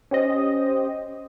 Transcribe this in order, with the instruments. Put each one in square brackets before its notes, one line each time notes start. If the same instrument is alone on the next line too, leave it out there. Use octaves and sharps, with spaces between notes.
[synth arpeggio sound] C#4 G4 C5 D#5